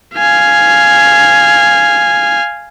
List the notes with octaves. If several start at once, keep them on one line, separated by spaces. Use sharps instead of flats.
F5 G#5